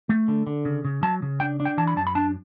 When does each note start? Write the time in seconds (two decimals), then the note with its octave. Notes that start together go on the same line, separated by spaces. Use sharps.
0.09 A3
0.28 D3
0.47 D3
0.65 C#3
0.85 C#3
1.03 F#3 A5
1.22 C#3
1.40 D4 G5
1.60 D4
1.65 G5
1.78 E3 A5
1.87 B5
1.96 F#2 A5
2.07 B5
2.15 D4 A5